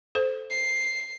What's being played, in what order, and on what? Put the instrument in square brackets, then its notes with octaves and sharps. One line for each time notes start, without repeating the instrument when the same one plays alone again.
[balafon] A4 C5
[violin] C7